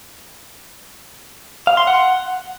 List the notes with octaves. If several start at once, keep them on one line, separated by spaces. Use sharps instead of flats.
F5
C6
F#5